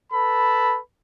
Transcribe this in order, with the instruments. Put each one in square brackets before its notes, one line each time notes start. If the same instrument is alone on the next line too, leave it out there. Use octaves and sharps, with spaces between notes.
[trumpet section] A4 B4 B5